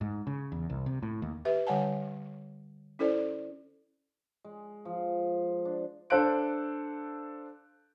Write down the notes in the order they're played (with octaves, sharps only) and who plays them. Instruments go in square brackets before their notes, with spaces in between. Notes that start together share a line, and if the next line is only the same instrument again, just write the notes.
[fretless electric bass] G#2
C#3
E2
C2
C3
A2
D#2
[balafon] G4 B4 E5
D3 G3 C#5 F#5 G#5 A5
C#4 E4 A4 C5 D5
[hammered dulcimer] G#3
F3
D4
[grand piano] D4 A4 C5 F5 F#6 D7